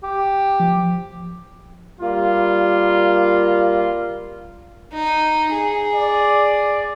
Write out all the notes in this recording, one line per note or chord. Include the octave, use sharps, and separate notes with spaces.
G4
F3
G3 A#3 F4
D#4
G#4
D5